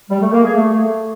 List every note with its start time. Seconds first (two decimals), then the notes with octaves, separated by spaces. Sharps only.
0.09 G3
0.20 A3
0.32 A#3
0.43 G#4
0.54 A3